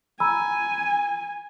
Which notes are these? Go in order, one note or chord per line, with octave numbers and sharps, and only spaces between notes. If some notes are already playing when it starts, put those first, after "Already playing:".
G#5 A#5 B5 E6